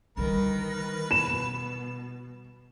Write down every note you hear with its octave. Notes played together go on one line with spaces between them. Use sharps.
D3 D#3 G3 A#4 B4
B2 E7